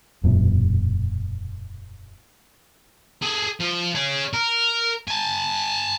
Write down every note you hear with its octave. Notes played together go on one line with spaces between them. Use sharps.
E1 F#2 A#2
G#4 A4
F3
G#4 C#5
A#4
G#5 A5